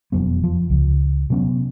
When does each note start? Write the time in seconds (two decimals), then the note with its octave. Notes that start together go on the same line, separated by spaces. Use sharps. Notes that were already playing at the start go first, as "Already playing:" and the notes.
0.12 E1 F2 F#3 B3
0.44 F3
0.70 C#2
1.30 C3 F#3 B3 C#4